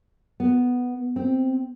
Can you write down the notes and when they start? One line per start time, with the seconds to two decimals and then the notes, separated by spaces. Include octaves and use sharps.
0.40 B3
1.16 C4